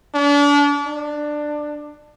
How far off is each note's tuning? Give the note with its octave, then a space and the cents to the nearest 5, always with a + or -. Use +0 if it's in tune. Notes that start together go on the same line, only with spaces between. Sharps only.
D4 -35
D4 +15